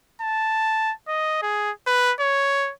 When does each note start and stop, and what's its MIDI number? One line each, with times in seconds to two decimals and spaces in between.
0.22 0.93 81
1.08 1.41 75
1.42 1.71 68
1.87 2.12 71
2.20 2.72 73